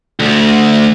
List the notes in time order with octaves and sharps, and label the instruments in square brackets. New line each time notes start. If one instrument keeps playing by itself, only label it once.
[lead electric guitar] D2